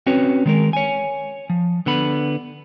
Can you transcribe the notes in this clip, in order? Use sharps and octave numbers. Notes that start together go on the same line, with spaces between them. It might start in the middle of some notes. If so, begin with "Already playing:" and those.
C4 C#4 F#4 B4 C#5
D#3 G#3 A#4
C#5 G#5
F3
D3 B3 B5